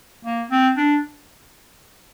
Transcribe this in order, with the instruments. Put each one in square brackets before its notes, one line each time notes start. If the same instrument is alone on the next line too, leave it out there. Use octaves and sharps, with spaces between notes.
[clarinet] A#3
C4
D4